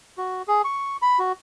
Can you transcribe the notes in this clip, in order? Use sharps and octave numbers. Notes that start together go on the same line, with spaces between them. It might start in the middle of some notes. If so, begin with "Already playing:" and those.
F#4
G#4
C#6
B5
F#4